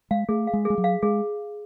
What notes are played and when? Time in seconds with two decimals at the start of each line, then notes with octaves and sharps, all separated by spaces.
0.11 G#3 F5
0.29 A3 G#4
0.47 F5
0.53 G#3
0.65 G#3 G#4
0.78 F#3
0.84 F5
1.03 G#3 G#4